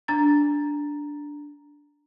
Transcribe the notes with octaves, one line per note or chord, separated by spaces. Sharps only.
D4 A#5 A6